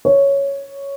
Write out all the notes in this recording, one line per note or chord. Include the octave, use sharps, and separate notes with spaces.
C#5